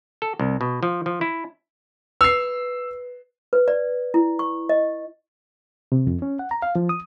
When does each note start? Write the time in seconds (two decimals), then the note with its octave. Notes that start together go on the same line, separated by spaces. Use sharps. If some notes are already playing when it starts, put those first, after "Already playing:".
0.22 A4
0.40 C2
0.61 B2
0.83 F3
1.06 F3
1.21 E4
2.21 B4 E6 C7
3.53 B4
3.68 D5
4.14 E4
4.39 C#6
4.69 D#5
5.92 C3
6.07 F2
6.22 C#4
6.39 F#5
6.51 A#5
6.62 F5
6.76 F3
6.89 D#6